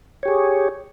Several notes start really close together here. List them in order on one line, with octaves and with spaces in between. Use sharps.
C#5 G4 G#4